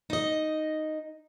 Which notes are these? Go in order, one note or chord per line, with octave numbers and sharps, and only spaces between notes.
D#4 D#5